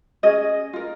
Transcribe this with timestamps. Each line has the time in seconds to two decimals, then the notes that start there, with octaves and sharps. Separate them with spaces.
0.23 C#4 G#4 D#5
0.73 F4 A#4